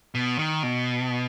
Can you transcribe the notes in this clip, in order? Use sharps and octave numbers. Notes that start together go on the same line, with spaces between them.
B2
D#3
B2